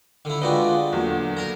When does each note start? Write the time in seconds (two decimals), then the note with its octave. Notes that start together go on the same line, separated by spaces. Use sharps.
0.25 D3 E4
0.42 G#3 D4 F4 F#4 B4 D5 D#5 G5
0.93 E2 A#2 D3 F#3
1.37 A#4 A#5